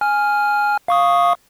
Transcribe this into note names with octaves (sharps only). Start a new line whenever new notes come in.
G#5 F6
F5 C#6 D#6